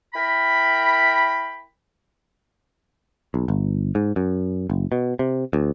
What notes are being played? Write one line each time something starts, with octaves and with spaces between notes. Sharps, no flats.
E4 A#4 G5 B5
B1
G1
G#2
F#2
F#1
B2
C3
D2